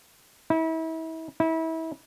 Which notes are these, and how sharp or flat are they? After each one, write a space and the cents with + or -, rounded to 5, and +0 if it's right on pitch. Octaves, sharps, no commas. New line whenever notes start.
E4 -35
E4 -30